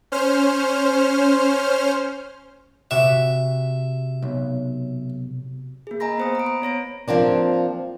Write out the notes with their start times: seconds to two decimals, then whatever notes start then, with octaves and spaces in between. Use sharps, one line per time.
0.12 C#4 C5 F6
2.91 C3 F#4 E5 B6
4.22 B1
5.87 A#3 G#4
6.00 D#5 G#5 A#5 B5 A#6
6.18 B3 C5 D#6
6.35 A#5 D7
6.46 B5
6.62 B3 C#5 A#6 D7
7.08 F3 A#3 C4 D4